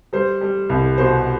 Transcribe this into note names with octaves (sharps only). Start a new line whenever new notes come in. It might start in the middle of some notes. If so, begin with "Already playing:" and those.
G3 C5
G3
C2
B2 C5